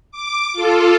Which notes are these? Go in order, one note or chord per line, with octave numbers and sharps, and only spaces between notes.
D6
F4 A4